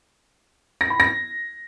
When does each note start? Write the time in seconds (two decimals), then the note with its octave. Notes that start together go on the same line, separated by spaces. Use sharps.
0.81 A#6
0.90 B5
1.00 A#6